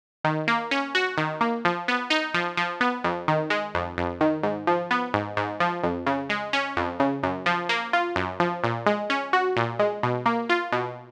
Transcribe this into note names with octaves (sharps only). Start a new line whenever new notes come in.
D#3
A#3
C#4
F#4
D#3
A#3
F3
B3
D#4
F3
F3
B3
F2
D#3
G#3
F2
F2
D#3
G#2
F3
B3
G#2
G#2
F3
F2
C#3
G#3
C#4
F2
C#3
F#2
F3
A#3
F4
F#2
F3
A#2
G#3
C#4
F#4
A#2
G#3
B2
A#3
F4
B2